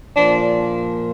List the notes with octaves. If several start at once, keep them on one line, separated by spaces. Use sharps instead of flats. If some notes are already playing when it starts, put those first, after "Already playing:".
A#2 F3 D4